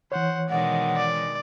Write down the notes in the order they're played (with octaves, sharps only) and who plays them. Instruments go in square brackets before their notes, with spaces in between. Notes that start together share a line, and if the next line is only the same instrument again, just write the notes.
[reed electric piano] E3 C#5 [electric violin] C5 F#5
[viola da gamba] B2 D#3 G#3 [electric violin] D5 [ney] F#5
[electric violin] D5